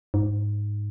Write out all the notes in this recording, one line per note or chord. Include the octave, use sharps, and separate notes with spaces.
G#2